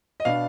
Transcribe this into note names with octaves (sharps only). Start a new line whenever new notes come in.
D#5
B2 B3 D4 F5